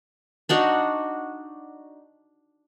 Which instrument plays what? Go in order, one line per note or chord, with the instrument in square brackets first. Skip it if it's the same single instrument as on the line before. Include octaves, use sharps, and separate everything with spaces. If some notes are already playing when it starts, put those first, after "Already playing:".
[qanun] D4 D#4 F#4